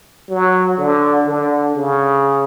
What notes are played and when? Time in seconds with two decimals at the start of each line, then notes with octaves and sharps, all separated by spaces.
0.29 F#3
0.78 D3
1.27 D3
1.76 C#3